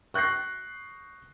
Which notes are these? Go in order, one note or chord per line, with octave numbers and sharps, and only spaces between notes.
C#6 F#6 G6 A#6 C7